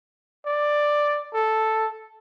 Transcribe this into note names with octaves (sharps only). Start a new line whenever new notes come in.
D5
A4